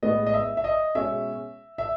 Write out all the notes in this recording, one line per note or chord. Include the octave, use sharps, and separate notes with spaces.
A2 G#3 B3 D#5
D#5
E5
E5
D#5
B2 G#3 C#4 E5
E5